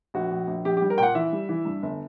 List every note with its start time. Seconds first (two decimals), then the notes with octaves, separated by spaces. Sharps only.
0.14 A#1 F#4
0.31 A#1
0.47 A#1
0.65 A#1 G4
0.77 G4
0.82 G3
0.90 A#4
0.98 A#2 F#5 G5
1.15 E3 E5
1.33 G3
1.49 E3
1.65 G2
1.83 G1